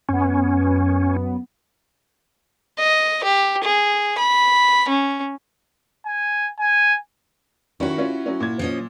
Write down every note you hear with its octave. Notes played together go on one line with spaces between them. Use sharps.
F#2 B3 C#4
D#5
G4
G#4
B5
C#4
G#5
G#5
D#3 C#4 E4 F#4
C#4 F4
F#3 C#4
A#2 G#6
F3 C#4 D#5